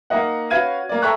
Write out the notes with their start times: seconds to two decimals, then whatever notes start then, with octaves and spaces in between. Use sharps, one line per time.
0.10 A#3 D#4 D#5 F#5
0.50 C#4 F#4 B4 F5 G#6 D#7
0.89 A#3 D5
1.02 A4 E5 G5 A#5 C#6 F#6